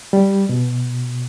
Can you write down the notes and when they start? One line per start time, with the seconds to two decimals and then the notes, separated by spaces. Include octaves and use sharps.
0.13 G3
0.49 B2